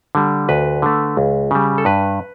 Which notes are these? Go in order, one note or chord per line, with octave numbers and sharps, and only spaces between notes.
D3 G3
D2 B4
D3 A3
C#2
C#3 G3
A4
G2 B4